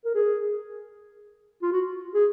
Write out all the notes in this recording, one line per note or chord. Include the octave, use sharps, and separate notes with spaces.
A#4
G#4
F4
F#4
G#4